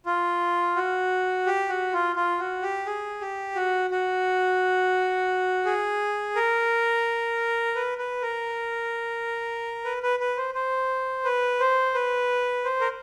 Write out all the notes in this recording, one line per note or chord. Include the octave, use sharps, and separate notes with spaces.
F4
F#4
G4
F#4
F4
F4
F#4
G4
G#4
G4
F#4
F#4
G#4
A#4
B4
B4
A#4
B4
B4
B4
C5
C5
B4
C5
B4
C5
A#4